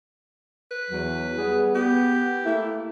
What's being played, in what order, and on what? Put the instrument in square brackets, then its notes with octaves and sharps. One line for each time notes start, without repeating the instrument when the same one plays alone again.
[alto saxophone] B4
[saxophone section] E2 F#3
G3 B3 G#4
[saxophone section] B3 [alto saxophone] G4
[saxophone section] A3 A#3 E4